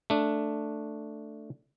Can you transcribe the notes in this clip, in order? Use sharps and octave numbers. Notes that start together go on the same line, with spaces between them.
A3 D4